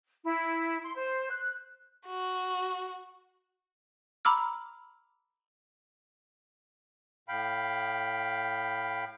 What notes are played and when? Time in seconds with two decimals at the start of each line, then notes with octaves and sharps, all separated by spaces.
0.24 E4
0.83 C6
0.95 C5
1.30 F#6
2.07 F#4
4.25 A#5 B5 D6 E6 F6
7.28 A2 F5 G5 B5